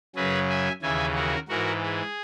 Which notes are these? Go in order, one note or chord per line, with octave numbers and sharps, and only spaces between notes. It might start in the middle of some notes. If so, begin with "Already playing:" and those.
F#2 C#3 F#3 G#4 B4
E5 G#5
D#2 C#3 E3 E5 G#5
F#4 A#4
G#2 E3 F#4 A#4
G#4